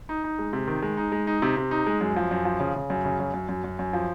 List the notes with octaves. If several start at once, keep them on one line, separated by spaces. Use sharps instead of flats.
D#4
D#4
G#3
C3
D#3
G#3
D#4
G#3
D#4
C3
C3
D#4
G#3
F#2
F3
F#2
F3
C#3
C#3
F#2
C#3
F#2
F#2
F#2
F#2
F#2
F3